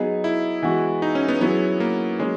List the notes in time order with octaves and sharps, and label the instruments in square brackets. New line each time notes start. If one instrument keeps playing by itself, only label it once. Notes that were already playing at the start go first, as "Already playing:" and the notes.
Already playing: [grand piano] F#3 B3 D#4 G#4
[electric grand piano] E4
[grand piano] E3 G#3 B3 F#4
[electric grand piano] D#4
C#4
B3
[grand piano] F#3 C#4 E4 G#4 [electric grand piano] B3
[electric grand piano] A#3
[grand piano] F#3 A#3 C#4 [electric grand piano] G#3